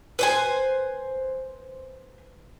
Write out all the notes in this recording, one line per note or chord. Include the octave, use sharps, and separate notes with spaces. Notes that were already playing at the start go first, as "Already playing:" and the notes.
B4 C5 G#5